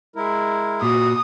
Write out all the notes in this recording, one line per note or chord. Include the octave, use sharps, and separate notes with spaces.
G#3 E4 A#4
A#2 F#4 D#6